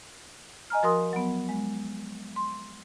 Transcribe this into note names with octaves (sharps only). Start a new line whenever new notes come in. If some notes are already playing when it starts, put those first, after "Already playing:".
D#5 G#5 A#5 F6
F3 F#4 A#4 C6 D#6
F#3 B3
G#3
C6